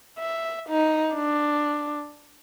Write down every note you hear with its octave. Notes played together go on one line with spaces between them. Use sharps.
E5
D#4
D4